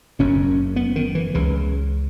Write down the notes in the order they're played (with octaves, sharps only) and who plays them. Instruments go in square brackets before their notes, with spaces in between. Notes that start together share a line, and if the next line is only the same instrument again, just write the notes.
[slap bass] F#1 F#2 C#3 C#4
B3
D#3
E3
C#2 C#3 E3